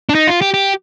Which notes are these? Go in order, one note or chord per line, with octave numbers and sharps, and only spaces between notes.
D4
D#4
F4
G4
G4